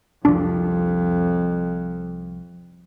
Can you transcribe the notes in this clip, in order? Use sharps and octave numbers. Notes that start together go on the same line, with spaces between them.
C2 F2 F3 D4